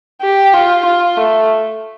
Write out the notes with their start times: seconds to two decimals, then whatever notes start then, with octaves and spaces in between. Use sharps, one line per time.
0.22 G4
0.53 F4
0.85 F4
1.17 A3